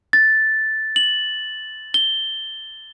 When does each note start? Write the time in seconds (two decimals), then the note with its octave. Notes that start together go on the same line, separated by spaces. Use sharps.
0.13 A6
0.96 F#7
1.94 G7